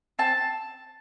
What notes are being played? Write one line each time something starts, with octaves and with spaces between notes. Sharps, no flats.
C4 A5